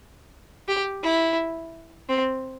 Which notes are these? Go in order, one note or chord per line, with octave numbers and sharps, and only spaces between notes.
G4
E4
C4